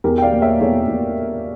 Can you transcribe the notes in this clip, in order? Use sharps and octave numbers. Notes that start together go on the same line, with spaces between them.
E2 G4 A#4
G5
D5 F5
A#3
C#5 E5
E2 A4 C#5
E2